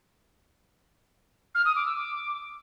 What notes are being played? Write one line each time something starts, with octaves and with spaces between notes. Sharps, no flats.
F6
D#6
D6
E6
D6